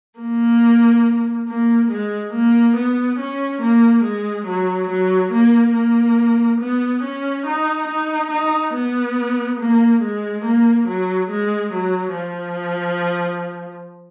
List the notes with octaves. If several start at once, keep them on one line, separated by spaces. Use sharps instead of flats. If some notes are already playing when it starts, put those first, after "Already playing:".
A#3
A#3
G#3
A#3
B3
C#4
A#3
G#3
F#3
F#3
A#3
A#3
B3
C#4
D#4
D#4
D#4
B3
A#3
G#3
A#3
F#3
G#3
F#3
F3